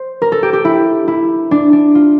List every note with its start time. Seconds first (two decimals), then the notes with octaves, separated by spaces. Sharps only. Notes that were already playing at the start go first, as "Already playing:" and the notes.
Already playing: C5
0.22 A#4
0.32 A4
0.43 G4
0.53 G4
0.65 E4
1.08 E4
1.51 D4
1.73 D4
1.95 F4